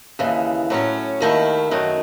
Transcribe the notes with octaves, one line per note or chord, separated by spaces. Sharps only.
D#2 C#3 E3
A2 F#3 C#4
D#2 D#3 A3 E4
F#2 D#3 F#3 A3